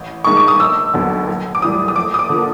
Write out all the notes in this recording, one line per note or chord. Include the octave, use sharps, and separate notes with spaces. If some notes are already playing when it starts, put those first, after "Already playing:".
Already playing: A1
G2 D#3 G#3 C#6
D6
D#6
F1 E6
D#2 D3 F#3 B3
B1
D6
A2 E3 G3 D#6
D#6
F2 D6
D#6
D6
D3 F3 A#3